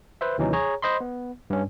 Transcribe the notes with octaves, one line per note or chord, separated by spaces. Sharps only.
B4 C5 E5
D#2 C3 E3 F#3 C#4 D#4
G#4 C#5 A#5
C5 D#5 B5 C6
B3
G2 C#4